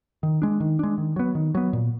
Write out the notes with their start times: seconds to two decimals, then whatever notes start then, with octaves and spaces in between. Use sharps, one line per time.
0.23 D#3
0.42 G#3 D4
0.60 D#3
0.79 G#3 D4
0.98 D#3
1.16 F#3 B3
1.35 D#3
1.55 F#3 B3
1.73 A#2